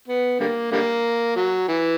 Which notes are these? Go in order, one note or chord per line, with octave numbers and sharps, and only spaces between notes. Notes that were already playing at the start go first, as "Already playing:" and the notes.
B3
D3 G3 A#3
D3 G3 A#3
F#3
E3